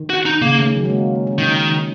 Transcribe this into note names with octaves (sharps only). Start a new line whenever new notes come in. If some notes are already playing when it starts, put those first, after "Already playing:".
Already playing: D#3
F#4
D#4
C#3 A#3
D#3
F#3
G#3
A#3
A#3
C#4
D#3 D#4